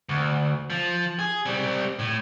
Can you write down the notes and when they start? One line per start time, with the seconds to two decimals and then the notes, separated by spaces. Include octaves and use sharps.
0.09 D2
0.70 F3
1.19 G#4
1.46 G3 C4
1.99 A2